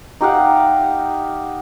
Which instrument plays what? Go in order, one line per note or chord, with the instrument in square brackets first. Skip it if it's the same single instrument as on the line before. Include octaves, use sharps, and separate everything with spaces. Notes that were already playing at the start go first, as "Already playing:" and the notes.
[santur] D#4 G4 F5 F#5